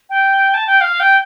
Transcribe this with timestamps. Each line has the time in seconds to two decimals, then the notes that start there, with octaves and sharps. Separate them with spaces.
0.10 G5
0.54 A5
0.67 G5
0.81 F5
1.00 G5